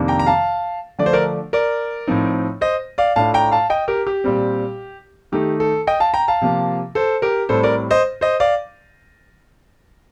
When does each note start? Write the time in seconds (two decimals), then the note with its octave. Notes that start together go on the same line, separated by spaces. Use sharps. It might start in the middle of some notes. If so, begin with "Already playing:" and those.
Already playing: F2 C3 D#3 A#3 D4
0.08 G5 A#5
0.19 A#5
0.26 F5 A5
0.99 D3 F3 A3 D4 D5
1.06 C5
1.13 A#4 D5
1.53 A#4 D5
2.08 A2 F3 C4 D#4
2.61 C5 D#5
2.98 D5 F5
3.16 A2 A3 D4 F4 F5 A5
3.34 G5 A#5
3.51 F5 A5
3.70 D#5 G5
3.88 G4 A#4
4.07 G4
4.24 A#2 G3 C4
5.32 D#3 A3 D#4 G4
5.60 A4
5.87 D#5 G5
6.00 F5 A5
6.14 G5 A#5
6.28 F5 A5
6.42 C3 F3 A#3 F4
6.95 A4 C5
7.22 G4 A#4
7.49 A2 G3 C4 A4 C5
7.63 A#4 D5
7.91 C5 D#5
8.21 C5 D#5
8.40 D5 F5